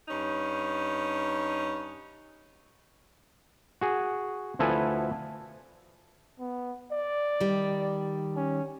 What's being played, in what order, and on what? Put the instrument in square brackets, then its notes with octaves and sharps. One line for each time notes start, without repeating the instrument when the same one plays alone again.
[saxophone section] G2 C#4 D#4
[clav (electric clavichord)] F#4 G#4
D2 F3 E4 A4 B4 G#5
[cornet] B3
D5
[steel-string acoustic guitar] D#3 G3
[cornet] C#4